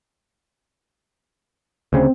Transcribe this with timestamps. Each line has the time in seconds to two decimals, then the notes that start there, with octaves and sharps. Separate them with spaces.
1.93 D2 C#3 C4